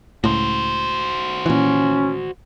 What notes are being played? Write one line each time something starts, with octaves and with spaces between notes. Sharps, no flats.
C#2 A2 F#4 C5
A#2 E3 C#4